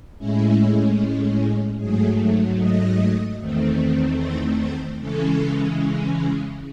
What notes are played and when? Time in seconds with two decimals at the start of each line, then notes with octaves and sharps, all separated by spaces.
0.18 A2 G#3 C#4 E4
1.79 G#2 F#3 A3 G#4
2.59 D#5
3.39 E2 D#3 A3 C4
4.19 C5
4.59 C5
4.99 C#3 E3 G#3 C#4 A4